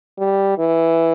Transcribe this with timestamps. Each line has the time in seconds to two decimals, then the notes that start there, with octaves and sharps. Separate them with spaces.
0.19 G3
0.59 E3